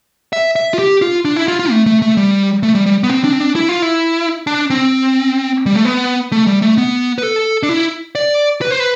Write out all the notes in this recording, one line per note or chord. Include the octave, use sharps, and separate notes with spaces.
E5
E5
F4
G4
F4
D4
E4
F4
F4
A3
A3
A3
G3
A3
G3
G3
B3
C4
D4
C4
D4
E4
F4
E4
D4
C4
G3
A3
B3
A3
G3
A3
B3
B4
A4
D4
E4
D5
B4
C5
B4